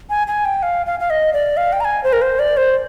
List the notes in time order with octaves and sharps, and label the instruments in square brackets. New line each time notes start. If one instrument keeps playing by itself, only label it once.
[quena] G#5
G#5
G5
F5
F5
F5
D#5
D5
F5
G5
A#5
G#5
C5
A#4
C5
D5
C5